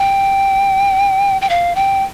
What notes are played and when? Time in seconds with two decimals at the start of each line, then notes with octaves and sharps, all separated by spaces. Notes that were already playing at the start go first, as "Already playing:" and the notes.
Already playing: G5
1.41 G5
1.50 F5
1.75 G5